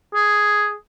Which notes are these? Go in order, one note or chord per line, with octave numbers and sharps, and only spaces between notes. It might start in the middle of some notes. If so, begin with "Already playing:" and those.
G#4